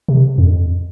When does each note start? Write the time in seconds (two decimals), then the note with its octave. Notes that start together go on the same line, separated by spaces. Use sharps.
0.08 C3
0.38 F2